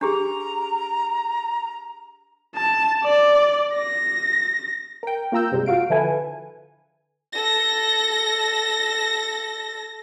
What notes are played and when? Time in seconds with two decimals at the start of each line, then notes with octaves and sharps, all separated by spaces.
0.01 D4 G4 G#4 A#5
2.55 A5
3.04 D5
3.74 A#6
5.03 A#4 G5
5.32 A#3 F4 A#5 E6 G6
5.51 G2 C3 G3 G#3
5.66 F4 F#4 F5 D7
5.90 D3 F3 E4 A4 B4 G#5
7.33 A4 A#6